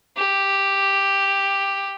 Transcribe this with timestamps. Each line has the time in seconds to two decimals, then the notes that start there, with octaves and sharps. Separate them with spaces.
0.17 G4